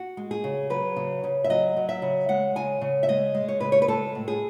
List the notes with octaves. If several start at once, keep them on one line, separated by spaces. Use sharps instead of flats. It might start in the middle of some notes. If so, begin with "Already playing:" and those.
Already playing: F#4
G#3
G#4
C#3
F#3 B4
C#3
C#3
E5
F#3 D#5
F#3
E5
C#3
G#3 F#5
C#3 G#5
C#3
E5
G#3 D#5
G#3
C#5
C#3 B4
C#5
B4
G#3 A4
A2
G#4